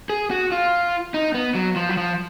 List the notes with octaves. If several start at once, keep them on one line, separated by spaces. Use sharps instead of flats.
G#4
F#4
F4
D#4
B3
F#3
F3
F#3
F3